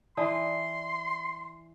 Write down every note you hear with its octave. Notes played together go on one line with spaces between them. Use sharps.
E3 D5 A5 C6 D#6